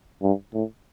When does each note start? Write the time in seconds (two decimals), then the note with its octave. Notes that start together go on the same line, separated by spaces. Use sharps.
0.22 G2
0.54 A2